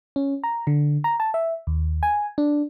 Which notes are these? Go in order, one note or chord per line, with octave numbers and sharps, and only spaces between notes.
C#4
A#5
D3
A#5
A5
E5
D#2
G#5
D4